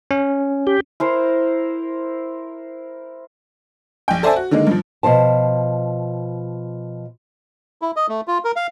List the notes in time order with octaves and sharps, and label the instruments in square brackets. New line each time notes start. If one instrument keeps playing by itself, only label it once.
[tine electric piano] C#4
[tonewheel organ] G4
[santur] E4 A#4 C5
[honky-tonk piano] A#1 G5
A4 C5 D5 E5 G#5 A5
F#4
D3 D#3 G#3 A#3
G2 F3
[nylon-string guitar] B2 F3 C5 A5
[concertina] E4
D#5
A3
F4
A#4
F5